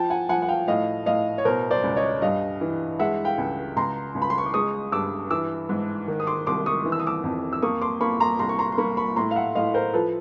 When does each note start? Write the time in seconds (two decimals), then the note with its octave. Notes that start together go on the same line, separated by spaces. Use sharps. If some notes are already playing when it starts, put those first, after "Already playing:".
Already playing: F3 G5 A5
0.10 F#5 G#5
0.29 F3 F#5 G#5
0.42 F#5
0.48 F5 G5
0.68 A2 D#5 F5
1.06 A2 D#5 F5
1.38 C#5
1.45 B2 A#4 C5
1.71 C5 D5
1.84 C#2
1.96 C#5 D#5
2.22 G2 D#5 F5
2.61 E3
2.99 G#3 E5 F#5
3.25 F5 G5
3.38 C#2
3.77 C#2 A#5 C6
4.15 C#2
4.22 B5
4.30 C6
4.38 C#6
4.46 D6
4.54 G#3 C#6 D#6
4.92 G2 D6 E6
5.30 E3 D6 E6
5.69 G#2
6.08 D#3
6.20 D#6
6.27 C6 D6
6.46 C2 C6 D6
6.66 C#6 D#6
6.85 E3
6.92 E6
6.99 D#6
7.07 D6 E6
7.24 F2
7.53 E6
7.62 A#3 C#6 D#6
7.81 C6 D6
8.01 A#3 B5 C#6
8.20 A#5 C6
8.39 C2 A#5 C6
8.49 C#6
8.59 A#5 C6
8.72 C6
8.78 A#3 B5 C#6
8.97 B5 C#6
9.16 A2 A#5 C6
9.31 F5
9.36 E5 F#5
9.55 A2 D#5 F5
9.74 A#4 C5
9.94 F3 A4 B4